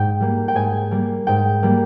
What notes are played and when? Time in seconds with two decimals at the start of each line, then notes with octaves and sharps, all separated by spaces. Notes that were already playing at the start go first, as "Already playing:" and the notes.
Already playing: G#2 G5
0.20 G3 A#3
0.48 G5
0.55 G#2 G#5
0.91 G3 A#3
1.27 G#2 G5
1.63 G3 A#3